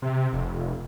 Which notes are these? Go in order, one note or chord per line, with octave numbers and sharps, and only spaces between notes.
C3
F1